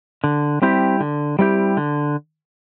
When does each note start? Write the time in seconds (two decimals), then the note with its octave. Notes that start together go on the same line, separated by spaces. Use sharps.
0.24 D3
0.62 G3 C4 E4 G4
1.00 D3
1.39 G3 C4 E4 G4
1.77 D3